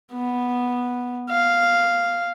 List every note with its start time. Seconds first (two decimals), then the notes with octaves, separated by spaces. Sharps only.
0.13 B3
1.30 F5